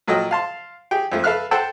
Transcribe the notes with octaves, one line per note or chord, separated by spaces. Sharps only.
A#2 F#3 A4 D#5 G5
F5 A5 C6
G4 G#4 G5
F2 F3 A3
A4 B4 E5 F5 F6 F#6
A4 C5 F#5 G5 A5 E6